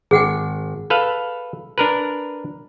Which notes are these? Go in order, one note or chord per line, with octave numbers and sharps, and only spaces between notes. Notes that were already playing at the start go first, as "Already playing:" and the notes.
G#1 G#4 F#5 G5
A4 B4 F5
D4 A#4 B4